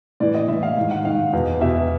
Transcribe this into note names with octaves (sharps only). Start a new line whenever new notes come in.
A2 E3 D5
D#5
A2 E3 E5
F5
G#2 D#3
F#5
G#2 D#3 F5
E2 B2
E2 B2 E5